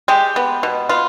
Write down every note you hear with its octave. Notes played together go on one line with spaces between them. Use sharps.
G#3 G4
B3
B2
B3 F4